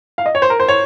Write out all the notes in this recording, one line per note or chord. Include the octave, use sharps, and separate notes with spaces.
F5
D#5
C#5
C5
A#4
C5
C#5